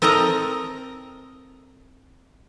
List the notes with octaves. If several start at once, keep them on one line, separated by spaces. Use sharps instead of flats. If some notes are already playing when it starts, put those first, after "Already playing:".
C4 A4 A#4 D#5 A#5